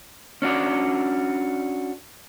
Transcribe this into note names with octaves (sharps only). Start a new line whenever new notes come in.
C#4 D4 F#4 D5